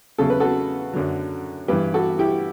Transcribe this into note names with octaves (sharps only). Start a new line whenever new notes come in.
E2 C#3 F#3 A4
B4
F#4 A4
F#2 D3 F#3
G2 E3 G4 B4
F#4 A4
E4 G4